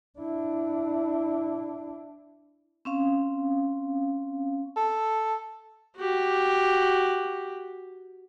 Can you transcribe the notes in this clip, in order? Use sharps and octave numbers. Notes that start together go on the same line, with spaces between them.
D4 E4
C4 C#4 F5
A4
F#4 G4